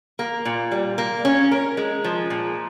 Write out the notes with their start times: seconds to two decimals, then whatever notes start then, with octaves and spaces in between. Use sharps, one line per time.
0.19 A#3
0.45 A#2
0.72 G3
0.98 A#3
1.25 C#4
1.51 A#4
1.77 G#3
2.04 F3
2.30 A#2